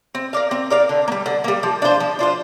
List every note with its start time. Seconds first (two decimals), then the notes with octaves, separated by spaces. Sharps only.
0.15 C4
0.33 A#4 D5 F5
0.51 C4
0.70 A#4 D5 F5
0.89 D3
1.08 A#3
1.12 G3
1.26 D3
1.44 G3 A#3
1.63 F3
1.82 D4 F4 C5
2.00 F3
2.19 D4 F4 C5